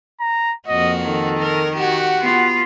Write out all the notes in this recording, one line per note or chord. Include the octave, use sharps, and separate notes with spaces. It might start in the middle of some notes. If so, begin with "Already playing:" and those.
A#5
F2 A#3 F#4 D#5
D#3 A4
A#4
F#4 G4 F#5
B3 F4